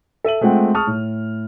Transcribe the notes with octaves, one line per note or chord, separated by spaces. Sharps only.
A4 E5 D#7 F#7
G#3 A3 C4 F4 F#5 G5
G#4 A5 C#6 D#6 F6
A2